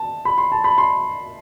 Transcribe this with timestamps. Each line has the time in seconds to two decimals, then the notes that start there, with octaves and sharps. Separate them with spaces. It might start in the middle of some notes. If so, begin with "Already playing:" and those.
Already playing: A5
0.25 B5
0.38 C6
0.52 A5
0.64 B5
0.78 C6